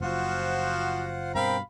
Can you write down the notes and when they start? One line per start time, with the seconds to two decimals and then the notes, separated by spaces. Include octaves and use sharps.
0.01 F#1 F3 F4 F#4 C5 F#5
1.35 G2 B2 C4 A#4 F5 G5 B5